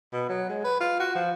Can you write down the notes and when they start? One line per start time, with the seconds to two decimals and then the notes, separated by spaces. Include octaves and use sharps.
0.13 B2
0.29 F#3
0.49 G#3
0.64 B4
0.80 F4
1.00 F#4
1.15 F3